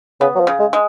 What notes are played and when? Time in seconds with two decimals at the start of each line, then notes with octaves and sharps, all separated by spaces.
0.21 C#3 B3
0.35 F#3
0.40 F3
0.47 C#3
0.60 G#3
0.73 G#3